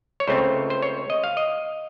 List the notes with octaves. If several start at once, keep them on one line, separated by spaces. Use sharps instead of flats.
C#5
C#2 C#3 A3 C4 C5
C5
C#5
D#5
F5
D#5